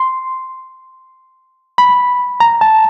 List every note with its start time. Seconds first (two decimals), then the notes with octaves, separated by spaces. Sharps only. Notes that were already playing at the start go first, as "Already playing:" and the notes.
Already playing: C6
1.78 B5
2.40 A#5
2.61 A5